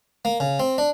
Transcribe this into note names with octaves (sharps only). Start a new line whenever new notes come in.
A#3
C#3
C4
D4